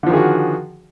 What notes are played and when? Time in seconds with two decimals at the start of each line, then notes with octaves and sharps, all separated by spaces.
0.03 D3
0.07 F3
0.10 D#3
0.13 G#4
0.17 F#4